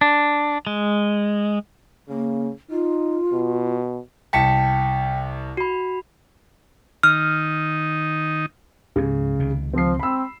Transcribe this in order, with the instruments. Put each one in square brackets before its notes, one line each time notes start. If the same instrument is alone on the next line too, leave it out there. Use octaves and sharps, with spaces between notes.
[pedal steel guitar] D4
G#3
[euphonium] C#3 [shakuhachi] A#3
[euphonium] D#4 [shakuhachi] F4
[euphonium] B2
[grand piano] C2 A5 C#7 [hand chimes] G5 B6
[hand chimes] F#4 B5
[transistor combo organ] D#3 D#4 [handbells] F6
[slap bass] C#2 G#2 [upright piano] C#3
[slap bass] C#2 C3 D#3
[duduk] F3 [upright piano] C4 C7
[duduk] C4 [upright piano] B5 E6